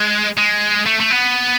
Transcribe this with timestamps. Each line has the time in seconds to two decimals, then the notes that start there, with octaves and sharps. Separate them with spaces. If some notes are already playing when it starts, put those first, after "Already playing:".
Already playing: G#3
0.37 G#3
0.86 A3
1.00 A3
1.11 B3